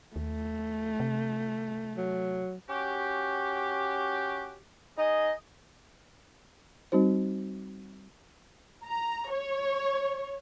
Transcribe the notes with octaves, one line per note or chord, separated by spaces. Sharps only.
D#2 A3
C3
F#3
C#4 F#4 G4
D#4 G#4 D#5
G3 C4 D#4 F#4 C5
A#5
C#5